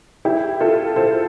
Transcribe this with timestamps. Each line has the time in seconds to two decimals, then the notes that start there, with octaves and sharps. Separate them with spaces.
0.25 E4 G4
0.61 F4 A4
0.96 A4 C5